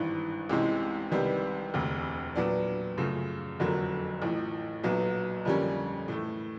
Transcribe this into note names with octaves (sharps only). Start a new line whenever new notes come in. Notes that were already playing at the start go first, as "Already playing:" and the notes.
Already playing: G#1 G2 E3
C2 C3 E3 G#3 C#4
C2 C3 D#3 G3 B3
E1 D2 C3
A#2 F#3 B3 D4
F#2 C#3 F3 A3
F1 F2 D3 F#3 A#3
A1 A2 F3
B1 A#2 F#3 B3
F2 D3 G3 A#3 C#4
A2 E3 A3